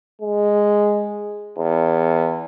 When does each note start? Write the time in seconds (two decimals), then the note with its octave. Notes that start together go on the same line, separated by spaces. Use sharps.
0.22 G#3
1.58 E2